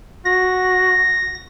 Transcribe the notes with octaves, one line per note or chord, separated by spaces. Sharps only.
F#4 A#6